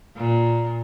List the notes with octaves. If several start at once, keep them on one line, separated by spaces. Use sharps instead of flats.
A#2